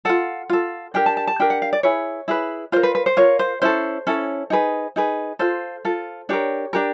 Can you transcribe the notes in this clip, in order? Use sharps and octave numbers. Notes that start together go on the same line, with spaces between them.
F4 A4 F#5
F4 A4
D4 G4 A#4 G5
A5
A5
A5
D4 G4 A#4 G5
F#5
F5
D5
E4 G#4 B4 C#5
E4 G#4 B4
F4 A#4 C5
B4
B4
C5
F4 A#4 C#5
C5
C#4 E4 A4 C5
C#4 E4 A4
D#4 G#4 B4
D#4 G#4 B4
F4 A4 C5
F4 A4
D4 G4 A#4 C#5
D4 G4 A#4